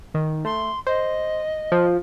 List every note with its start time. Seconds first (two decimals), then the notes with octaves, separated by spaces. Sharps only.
0.15 D#3
0.45 A3 C6
0.87 C5 D#5
1.72 F3